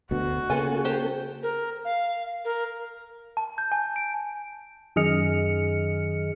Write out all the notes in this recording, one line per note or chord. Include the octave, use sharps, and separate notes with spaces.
D2 B2 F#4
C#3 A#3 B3 F4 G#4 A4 G#5
G4 C5
A#4
F5
A#4
A5
G6
G#5
D7
F#2 D#3 G#4 D#5 F6 C#7